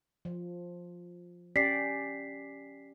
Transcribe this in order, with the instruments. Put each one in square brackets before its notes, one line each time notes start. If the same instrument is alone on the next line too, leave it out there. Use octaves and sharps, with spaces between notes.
[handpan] F3
[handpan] C#4 G4 D5 [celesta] B6 C7